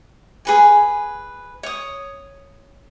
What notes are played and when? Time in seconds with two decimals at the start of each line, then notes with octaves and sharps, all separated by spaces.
0.45 G#4 B4 G#5
1.63 C#5 D#6